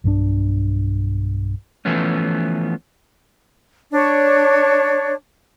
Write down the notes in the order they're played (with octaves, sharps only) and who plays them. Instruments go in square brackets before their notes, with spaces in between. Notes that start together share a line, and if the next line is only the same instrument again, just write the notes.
[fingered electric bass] B1 G2 F3 D4
[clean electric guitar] E3 F3 A3 B3 C#4
[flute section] D4 C#5